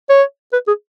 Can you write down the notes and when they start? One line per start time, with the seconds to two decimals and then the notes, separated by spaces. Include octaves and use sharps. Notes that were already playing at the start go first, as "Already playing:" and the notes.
0.10 C#5
0.53 B4
0.67 G#4